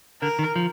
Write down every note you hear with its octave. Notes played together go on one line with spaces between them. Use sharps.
D3 A#4
D#3
F3